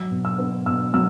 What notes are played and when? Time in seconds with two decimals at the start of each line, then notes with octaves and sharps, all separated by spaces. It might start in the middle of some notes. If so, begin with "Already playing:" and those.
Already playing: F#3 E6
0.11 B2
0.25 E6
0.39 B3
0.66 B2 E6
0.94 F#3 E6